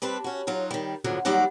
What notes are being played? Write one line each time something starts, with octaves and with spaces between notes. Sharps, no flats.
G3 C4 D4 B4
C#4 F#4
F#3 D#4 F4
D#3 G3
E2 G#2 D3 F3 F#3
D#2 F#3 G3 D#4 D5 F#5